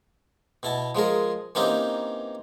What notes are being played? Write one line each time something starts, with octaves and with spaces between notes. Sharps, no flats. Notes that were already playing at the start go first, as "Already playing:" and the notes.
B2 E4 A5
F3 G#3 G#4 A#4
E3 A#3 C4 C#4 D#4 G4